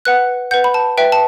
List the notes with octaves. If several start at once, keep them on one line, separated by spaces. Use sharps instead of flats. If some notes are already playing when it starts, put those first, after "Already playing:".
B4 F#5 F#6
B4 F#5 G6
B5
A5
B4 E5 G5
A5